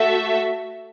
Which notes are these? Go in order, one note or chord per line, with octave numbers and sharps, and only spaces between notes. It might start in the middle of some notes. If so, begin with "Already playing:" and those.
Already playing: A3 F#4 A4 E5